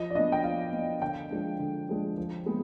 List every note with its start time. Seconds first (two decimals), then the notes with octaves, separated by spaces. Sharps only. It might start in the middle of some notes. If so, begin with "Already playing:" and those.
Already playing: F3 D#5
0.10 D5
0.15 B3 D4 D#5
0.32 G5
0.44 F3 F5
0.72 B3 D4
1.02 D3 G5
1.31 F3 G#3 D4
1.59 D3
1.89 F3 G#3 D4
2.18 F3
2.46 G#3 B3